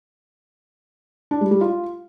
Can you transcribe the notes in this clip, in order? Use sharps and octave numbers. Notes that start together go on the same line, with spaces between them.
D4
G3
G3
F4